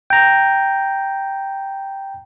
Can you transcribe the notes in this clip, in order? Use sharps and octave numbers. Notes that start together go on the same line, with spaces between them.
G5 A#5